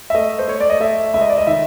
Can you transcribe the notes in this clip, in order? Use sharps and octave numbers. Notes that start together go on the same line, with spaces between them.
E5
A3 D#5
C5
A3 C#5
D5
D#5
A3 E5
C#2 E5
D#5
D5
D#5
D#3 E5